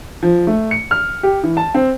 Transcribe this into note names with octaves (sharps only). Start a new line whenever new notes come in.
F3
A3
C#7
F6
G4
E3
A5
C4